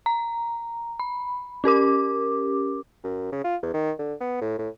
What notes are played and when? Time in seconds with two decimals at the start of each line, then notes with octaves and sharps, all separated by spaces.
0.06 A#5
1.00 B5
1.64 C#4 G4 A#4 D6
3.04 F#2
3.32 C#3
3.44 F4
3.63 E2
3.74 D#3
3.99 D3
4.21 B3
4.41 A2
4.58 A2